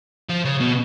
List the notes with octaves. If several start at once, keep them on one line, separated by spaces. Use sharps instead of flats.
F3
C#3
B2